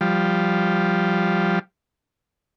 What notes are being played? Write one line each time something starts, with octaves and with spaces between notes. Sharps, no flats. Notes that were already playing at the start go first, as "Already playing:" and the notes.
F3 G3